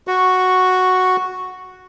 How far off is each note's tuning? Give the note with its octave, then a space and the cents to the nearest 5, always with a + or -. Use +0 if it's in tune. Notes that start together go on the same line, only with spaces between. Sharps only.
F#4 +0 C#6 -5